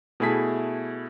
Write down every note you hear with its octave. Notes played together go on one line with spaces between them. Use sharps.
B2 A3 E4 G#4 A4 B6